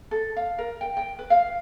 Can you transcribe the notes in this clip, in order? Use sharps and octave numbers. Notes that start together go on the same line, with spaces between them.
A4
F5
A#4
G5
G5
B4
F5